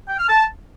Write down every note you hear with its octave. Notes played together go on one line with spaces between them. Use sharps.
G5
F6
A5